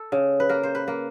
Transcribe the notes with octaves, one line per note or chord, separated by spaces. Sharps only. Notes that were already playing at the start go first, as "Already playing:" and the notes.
Already playing: A4
C#3
B4
A#3 A#4
C5
B4
A#3